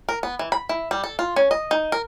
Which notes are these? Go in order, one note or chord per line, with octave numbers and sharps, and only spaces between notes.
A#4
B3
E3
B5
E4
G3
A4
F4
C#4
D#5
D#4
A#4